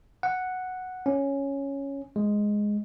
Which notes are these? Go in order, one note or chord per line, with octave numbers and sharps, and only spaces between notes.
F#5
C#4
G#3